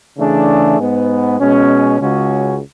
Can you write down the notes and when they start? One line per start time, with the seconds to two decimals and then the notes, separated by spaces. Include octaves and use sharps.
0.17 C#3 E3 A3 D4 G#4
0.78 G#2 G#3 B3
1.39 B2 G#3 C#4
2.00 C#2 C#3 G#3 C#4 F#4